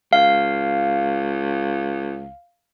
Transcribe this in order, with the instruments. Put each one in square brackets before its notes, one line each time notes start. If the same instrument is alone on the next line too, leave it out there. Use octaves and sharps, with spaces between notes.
[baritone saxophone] C#2 [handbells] F5